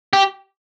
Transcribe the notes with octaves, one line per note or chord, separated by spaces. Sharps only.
G4